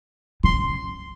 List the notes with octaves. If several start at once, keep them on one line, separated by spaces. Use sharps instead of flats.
C#3 C6